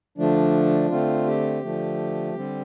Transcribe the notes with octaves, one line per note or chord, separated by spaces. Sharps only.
D3 F3 A3 D4
D3 A3 C4 F4
G4
D3 F3 A3
D3 G3 C4